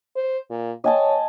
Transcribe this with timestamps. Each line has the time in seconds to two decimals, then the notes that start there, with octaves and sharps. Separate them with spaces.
0.16 C5
0.50 A#2
0.84 C#5 D#5 G#5 A5